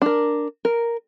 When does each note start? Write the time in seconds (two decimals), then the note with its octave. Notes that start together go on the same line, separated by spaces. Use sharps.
0.02 D4 A#4
0.65 A#4